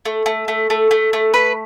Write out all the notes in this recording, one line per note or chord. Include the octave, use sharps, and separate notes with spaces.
A3
A3
A3
A3
A3
A3
B4